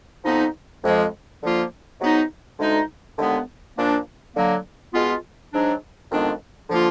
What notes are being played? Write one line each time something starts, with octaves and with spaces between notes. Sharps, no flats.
F2 F3 B3 D#4
F2 F3 G#3
D3 F3 A#3 F4
G#2 F#3 B3 D#4
D2 D3 G#3 D#4
D#2 D3 G#3 B3
A#2 F3 A#3 D4
D3 F#3 A#3
B2 G#3 B3 F4
G#2 F#3 D4
F2 D#3 G#3 B3 D4
D3 F3 A#3 F4